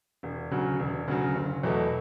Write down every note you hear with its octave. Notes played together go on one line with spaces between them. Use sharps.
E1
D2 C#3 F#3
E1
D2 C#3 F#3
F#1
E2 B2 F#3 A3